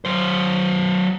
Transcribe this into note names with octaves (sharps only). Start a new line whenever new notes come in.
F#3 C5